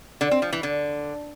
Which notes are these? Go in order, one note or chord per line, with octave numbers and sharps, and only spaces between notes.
D3
C4
F3
E3
D3